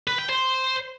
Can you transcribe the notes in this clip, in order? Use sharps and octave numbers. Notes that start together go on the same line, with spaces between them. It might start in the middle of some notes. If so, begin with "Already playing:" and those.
B4
G5
C5